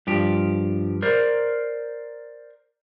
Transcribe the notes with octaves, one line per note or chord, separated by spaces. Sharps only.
G2 F3 G4
A#4 C5 D5